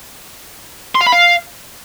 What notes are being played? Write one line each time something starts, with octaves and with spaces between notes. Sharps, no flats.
C6
F5
B5
F5